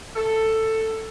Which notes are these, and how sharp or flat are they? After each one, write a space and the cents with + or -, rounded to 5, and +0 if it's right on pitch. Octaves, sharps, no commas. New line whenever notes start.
A4 +10